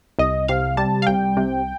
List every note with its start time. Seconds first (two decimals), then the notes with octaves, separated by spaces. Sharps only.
0.19 C2 D#5
0.48 C3 F5
0.77 G3 A5
1.02 F5
1.07 C2 G5
1.37 C3